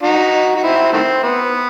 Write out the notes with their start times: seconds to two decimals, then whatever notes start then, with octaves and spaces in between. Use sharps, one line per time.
0.03 D#4 F#4
0.56 F#4
0.62 C4 E4
0.93 D#3 A3 C4
1.23 B3